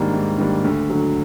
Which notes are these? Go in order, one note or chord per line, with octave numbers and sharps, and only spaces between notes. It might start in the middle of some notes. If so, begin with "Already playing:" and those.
Already playing: G#2 D#3 G3 A#3 D4 G#5
G#2
D#3 G3 A#3 D4
D2
D3 F#3